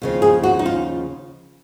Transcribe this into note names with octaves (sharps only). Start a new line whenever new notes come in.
D#2 C#3 F3
G#4
F#4
D#4
F4